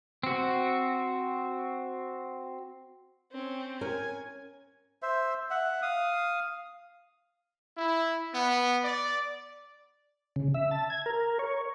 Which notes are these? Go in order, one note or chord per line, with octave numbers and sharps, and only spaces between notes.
C4 F#4
C4 C#4
C#4 A#4 G#5
C5 E5
E5 F#5
F5 D#6
E4
B3
D5
C#3
E5
A5
G#6
A#4
C#5